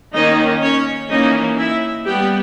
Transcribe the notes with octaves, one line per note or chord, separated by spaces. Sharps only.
D#3 A#3 C#4 D#4 D#5
C#4 C#5
E3 A#3 C#4 D#4 D#5
E4 E5
G3 B3 G4 G5